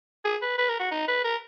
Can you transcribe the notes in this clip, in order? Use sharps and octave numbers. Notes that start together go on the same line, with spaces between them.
G#4
B4
B4
A#4
F#4
D#4
B4
A#4